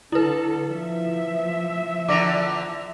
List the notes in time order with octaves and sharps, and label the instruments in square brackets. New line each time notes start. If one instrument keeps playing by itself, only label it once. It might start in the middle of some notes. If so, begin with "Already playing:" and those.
[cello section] D3 A4 [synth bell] E4 B4
[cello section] F3 E5
[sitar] E2 D3 [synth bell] D6 A#6 F7